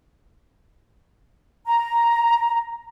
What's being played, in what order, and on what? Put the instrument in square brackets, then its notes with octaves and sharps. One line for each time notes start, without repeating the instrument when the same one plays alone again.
[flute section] A#5